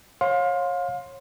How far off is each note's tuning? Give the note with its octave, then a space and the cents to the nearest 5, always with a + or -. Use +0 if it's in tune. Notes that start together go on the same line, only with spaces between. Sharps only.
C#5 -25 F5 +30 C6 +0